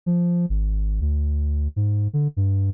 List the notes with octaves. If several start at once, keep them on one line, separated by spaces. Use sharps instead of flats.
F3
G#1
D2
G#2
D3
G2